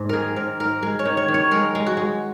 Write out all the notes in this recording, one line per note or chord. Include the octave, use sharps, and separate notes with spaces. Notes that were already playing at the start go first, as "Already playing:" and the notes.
Already playing: G#2
D#3 G#4 A#4
G#2 A#4
G#2 A#4
G#3 A#4
C#5
D#3
C#5
D#3
C#5
G#3 A#4
G#3
F#4
G#3